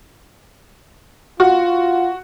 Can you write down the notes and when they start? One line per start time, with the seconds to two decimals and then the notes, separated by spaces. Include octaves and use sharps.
1.40 F4 F#4